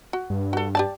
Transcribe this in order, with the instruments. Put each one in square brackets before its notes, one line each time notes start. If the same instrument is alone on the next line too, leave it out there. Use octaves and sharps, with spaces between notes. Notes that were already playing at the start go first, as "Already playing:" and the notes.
[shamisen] F#4
[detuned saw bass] G2
[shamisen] F#4 A4
G4 D5 A5